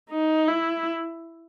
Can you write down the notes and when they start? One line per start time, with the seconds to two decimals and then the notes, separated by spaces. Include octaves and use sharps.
0.11 D#4
0.48 E4